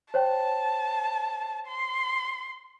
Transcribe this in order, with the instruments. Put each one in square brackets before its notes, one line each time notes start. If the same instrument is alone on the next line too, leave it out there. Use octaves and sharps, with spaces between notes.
[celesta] C5 C#5 G5 [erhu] A5
[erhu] C6